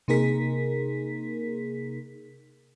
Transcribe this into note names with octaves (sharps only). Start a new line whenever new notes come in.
C3 A#3 D#4 G#4 A#4 B6